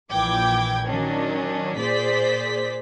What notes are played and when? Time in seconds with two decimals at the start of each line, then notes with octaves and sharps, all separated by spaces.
0.12 A#1 A#2 E3 G5 D6 G#6
0.88 D#3 F#3 C#4 D4
1.77 A#2 G#4 C5 D5 B6